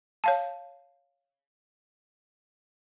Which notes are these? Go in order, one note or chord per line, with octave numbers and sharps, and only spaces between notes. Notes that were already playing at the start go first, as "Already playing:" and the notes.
C#5 F5 A5